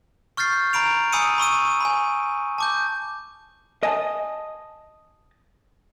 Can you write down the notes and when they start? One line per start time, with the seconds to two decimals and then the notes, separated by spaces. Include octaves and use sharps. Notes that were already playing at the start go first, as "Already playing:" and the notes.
0.37 C#6 F6 G6 A6 C7
0.73 A#5 B5 D7 F7
1.13 G#5 B5 D#6 E6 C#7 D#7
1.38 B5 C#6 E6 D#7
1.80 G#5 B5
2.58 A5 D6 G6
3.83 D#5 G#5 A5